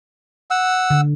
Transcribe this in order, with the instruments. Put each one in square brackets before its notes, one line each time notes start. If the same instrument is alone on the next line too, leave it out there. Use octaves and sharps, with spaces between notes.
[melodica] F#5 E6
[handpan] D3